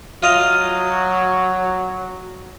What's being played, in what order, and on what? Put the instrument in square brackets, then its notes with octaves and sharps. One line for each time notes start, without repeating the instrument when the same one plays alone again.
[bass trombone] F#3 [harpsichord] F4 D#5 F5